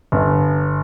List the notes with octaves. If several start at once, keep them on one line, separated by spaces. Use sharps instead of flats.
G1